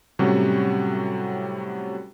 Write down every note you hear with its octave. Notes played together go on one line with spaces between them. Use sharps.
A2 C3 F#3 G3 C#4 F#4